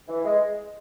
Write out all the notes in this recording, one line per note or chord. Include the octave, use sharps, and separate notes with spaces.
E3
G#3